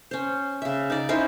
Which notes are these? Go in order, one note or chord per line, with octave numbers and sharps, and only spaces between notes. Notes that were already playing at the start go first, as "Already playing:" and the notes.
C#4 C5
C#3 E5
D#4 D5
C#4 D#4 E4 C5